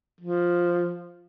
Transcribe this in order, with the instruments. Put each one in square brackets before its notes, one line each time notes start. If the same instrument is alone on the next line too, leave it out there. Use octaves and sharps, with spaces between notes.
[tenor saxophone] F3